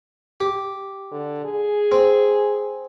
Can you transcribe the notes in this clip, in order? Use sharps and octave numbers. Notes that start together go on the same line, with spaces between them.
G4
D3
G#4
C4